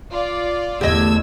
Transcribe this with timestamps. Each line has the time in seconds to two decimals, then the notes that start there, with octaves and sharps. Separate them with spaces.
0.11 F4 D5
0.81 E2 D3 A3 G4 D#5 E6 G#6